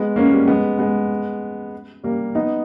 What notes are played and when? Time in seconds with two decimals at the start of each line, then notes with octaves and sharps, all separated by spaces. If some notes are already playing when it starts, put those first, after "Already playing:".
Already playing: G#3 B3
0.16 A#3 C#4
0.32 G3 A#3
0.48 G#3 B3
0.79 G#3 B3
2.04 G3 A#3
2.35 B3 D#4